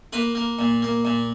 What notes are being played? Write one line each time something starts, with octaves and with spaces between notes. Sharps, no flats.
A#3 B4
A#3
A#2
A#3
A#2